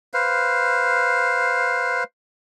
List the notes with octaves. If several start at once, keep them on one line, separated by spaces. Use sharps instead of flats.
B4 C5 F5